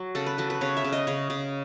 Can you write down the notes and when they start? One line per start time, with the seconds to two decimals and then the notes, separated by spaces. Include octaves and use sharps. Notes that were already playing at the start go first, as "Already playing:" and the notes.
Already playing: F#3
0.15 C#3 A4
0.26 B4
0.38 F#3 A4
0.50 B4
0.61 C#3 C#5
0.77 E5
0.85 C#3
0.93 D#5
1.07 C#3 C#5
1.30 C#3